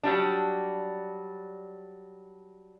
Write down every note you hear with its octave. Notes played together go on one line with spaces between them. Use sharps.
F#3 G3 D4